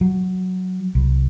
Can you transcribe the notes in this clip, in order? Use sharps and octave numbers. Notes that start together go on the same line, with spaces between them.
F#3
C2